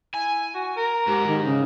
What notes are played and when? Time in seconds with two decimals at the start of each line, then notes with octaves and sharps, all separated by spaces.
0.14 E4 G#5
0.54 F#4
0.77 A#4
1.07 G#2 G4
1.27 D#3
1.45 C#3